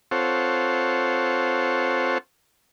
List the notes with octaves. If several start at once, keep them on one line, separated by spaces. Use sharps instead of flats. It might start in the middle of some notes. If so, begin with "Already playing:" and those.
C4 F4 A4 C5 C#5 F#5